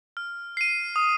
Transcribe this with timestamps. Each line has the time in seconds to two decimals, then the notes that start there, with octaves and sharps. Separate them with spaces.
0.17 F6
0.57 C7 D#7
0.96 D#6